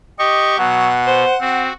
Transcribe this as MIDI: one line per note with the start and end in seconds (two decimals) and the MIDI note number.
0.19 0.58 67
0.19 0.57 75
0.19 0.58 85
0.58 1.25 47
0.58 0.89 54
0.58 1.62 78
1.07 1.36 72
1.41 1.70 60
1.41 1.73 66